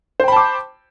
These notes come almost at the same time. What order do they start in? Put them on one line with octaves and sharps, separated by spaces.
C5 G5 B5 A5 D6